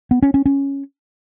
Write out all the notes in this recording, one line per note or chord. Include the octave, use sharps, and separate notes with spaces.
B3
C#4
C#4
C#4